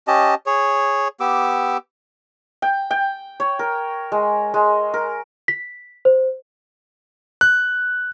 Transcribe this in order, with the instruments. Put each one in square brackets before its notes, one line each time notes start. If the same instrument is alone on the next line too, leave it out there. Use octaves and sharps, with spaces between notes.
[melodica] C#4 G4 D#5 A5
G#4 C#5
B3 G4 D6 E6
[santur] G5
G5
C#5
A#4
G#3
G#3
A#4
[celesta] B6
C5
[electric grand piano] F#6